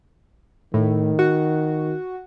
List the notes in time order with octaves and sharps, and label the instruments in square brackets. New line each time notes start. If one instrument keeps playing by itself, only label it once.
[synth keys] A2 [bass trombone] D#3
[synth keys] F#4